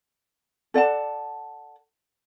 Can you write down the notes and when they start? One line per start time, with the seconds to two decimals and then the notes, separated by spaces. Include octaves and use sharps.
0.74 A4 D5 F#5 A5